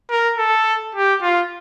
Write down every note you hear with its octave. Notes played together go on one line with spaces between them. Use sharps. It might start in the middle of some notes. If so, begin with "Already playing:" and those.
A#4
A4
G4
F4